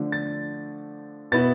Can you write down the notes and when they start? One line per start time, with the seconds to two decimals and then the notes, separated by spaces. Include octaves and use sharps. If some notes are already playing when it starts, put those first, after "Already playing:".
Already playing: D3 F3 A3 D4
0.12 A6
1.32 B2 B3 E4 A6